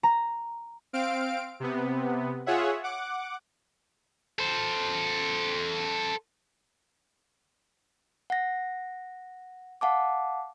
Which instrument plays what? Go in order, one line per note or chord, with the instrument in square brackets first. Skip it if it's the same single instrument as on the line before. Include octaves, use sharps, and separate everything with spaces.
[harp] A#5
[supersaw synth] C4 F5 D7
C3 B3
F4 G#4 C#5 E5 F#5
F#5 D6
[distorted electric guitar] A4 C5
[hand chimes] F#5 A#6
F5 F#5 A5 D6